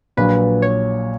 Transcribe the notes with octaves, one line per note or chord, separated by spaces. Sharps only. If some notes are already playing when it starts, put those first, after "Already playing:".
A#1 A#2 F#3 B4
C#5